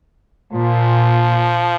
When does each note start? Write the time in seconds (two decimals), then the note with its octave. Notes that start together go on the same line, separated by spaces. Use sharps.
0.53 A#2 F3